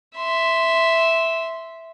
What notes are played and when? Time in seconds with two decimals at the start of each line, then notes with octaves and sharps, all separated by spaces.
0.17 E5 C6